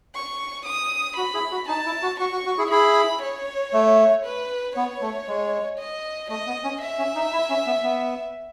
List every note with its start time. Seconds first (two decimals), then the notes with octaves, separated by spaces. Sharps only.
0.15 C#6
0.66 D#6
1.17 F#4 B5
1.34 E4 G#4
1.52 F#4
1.68 D#4 A5
1.86 E4
2.03 F#4
2.20 F#4 C#6
2.32 F#4
2.46 F#4
2.58 E4 G#4
2.71 E4 G#4 B5
3.22 C#5
3.73 A3
4.25 B4
4.76 B3 C#5
5.02 A3
5.28 G#3
5.79 D#5
6.30 A3 D#5
6.47 B3
6.64 C#4
6.82 E5
6.98 C#4
7.15 D#4
7.33 E4
7.49 C#4
7.67 B3
7.84 B3